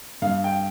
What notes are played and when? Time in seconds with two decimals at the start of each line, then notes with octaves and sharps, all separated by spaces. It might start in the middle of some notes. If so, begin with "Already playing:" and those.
0.22 G2 F5
0.44 G5